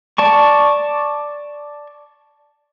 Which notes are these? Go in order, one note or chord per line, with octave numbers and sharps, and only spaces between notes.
D5 A5 C#6